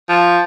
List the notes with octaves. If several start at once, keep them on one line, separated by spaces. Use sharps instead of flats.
F3